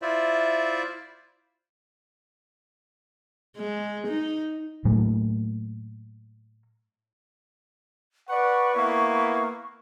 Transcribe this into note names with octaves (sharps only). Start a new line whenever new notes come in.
E4 F4 C5 D5 E5
G#3
D#4
A2 F#3 A3 A#3
B4 D5 F#5 C#6
A#3 B3 E4